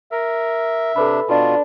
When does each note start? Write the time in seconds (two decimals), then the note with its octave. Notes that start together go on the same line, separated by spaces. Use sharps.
0.12 A#4 E5
0.96 C3 D4 A4 B4 B5
1.29 B2 D4 F4